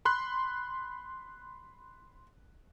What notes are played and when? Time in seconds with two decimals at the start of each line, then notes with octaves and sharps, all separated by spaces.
0.05 B5 C6 F#6